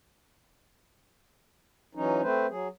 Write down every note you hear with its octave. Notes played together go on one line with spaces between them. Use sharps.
E3 F#3 C#4 D#4
A3 C4 B4 C5
F#3 G#4